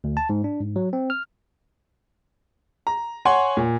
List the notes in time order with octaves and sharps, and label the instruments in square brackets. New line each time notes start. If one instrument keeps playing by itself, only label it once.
[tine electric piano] D2
A5
G#2
D4
G#2
F#3
C4
F6
[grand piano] A#5
C#5 F#5 G#5 C6
A#2